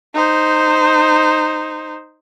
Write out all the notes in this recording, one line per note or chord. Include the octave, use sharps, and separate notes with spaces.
D#4 C5